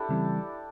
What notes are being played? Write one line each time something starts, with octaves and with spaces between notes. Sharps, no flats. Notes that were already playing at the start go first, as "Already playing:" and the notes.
Already playing: D4 E4 G4 A4
C#3 E3 G3 C4